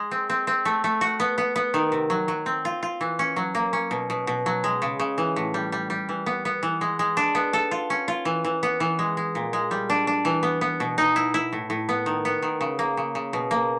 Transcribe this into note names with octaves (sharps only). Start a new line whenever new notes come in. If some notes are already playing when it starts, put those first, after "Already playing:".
Already playing: G#3
C4
C4
C4
A3
A3
F#4
B3
B3
B3
D#3
C3
F#3
F#3
C4
F4
F4
E3
C#4
F#3
A#3
C#4
B2
B2
B2
F#3
G#3
C#3
C#3
E3
A2
G3
G3
G3
E3
B3
B3
E3
G#3
G#3
D4
B3
A4
F4
C#4
F4
E3
E3
B3
E3
G#3
G#3
A#2
G#3
G3
D4
D4
E3
B3
B3
B2
D#4
E4
E4
A2
A2
B3
D#3
B3
D#3
C#3
A#3
C#3
C#3
B2
A#3